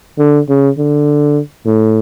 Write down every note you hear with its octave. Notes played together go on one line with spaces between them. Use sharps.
D3
C#3
D3
A2